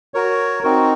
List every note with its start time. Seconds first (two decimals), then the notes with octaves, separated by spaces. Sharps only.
0.14 F#4 A#4 C#5
0.63 C4 D#4 F#4 A#4